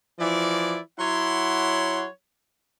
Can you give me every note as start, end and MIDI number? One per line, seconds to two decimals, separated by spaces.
0.19 0.78 52
0.19 0.78 53
0.19 0.78 64
0.19 0.78 74
0.99 2.07 54
0.99 2.07 64
0.99 2.07 73
0.99 2.07 78
0.99 2.07 84